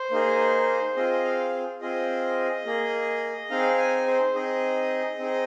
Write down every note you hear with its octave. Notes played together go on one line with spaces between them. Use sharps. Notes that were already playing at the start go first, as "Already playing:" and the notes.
Already playing: C5
A#3 D#4 G#4
C4 F4 G#4 D#5
F5
C4 F4 G#4 D#5
A#3 G#4
C4 D#4 G#4 F5
G#5
C5
C4 D#4 G#4 D#5
C4 D#4 G#4